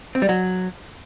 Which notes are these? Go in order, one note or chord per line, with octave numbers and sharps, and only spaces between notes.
C4
G3
F#3